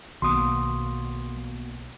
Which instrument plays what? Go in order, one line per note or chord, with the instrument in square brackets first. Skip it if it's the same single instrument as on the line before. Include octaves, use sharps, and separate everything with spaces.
[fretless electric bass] B1 D#3 [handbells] A#3 B3 F#4 [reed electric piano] C6 D#6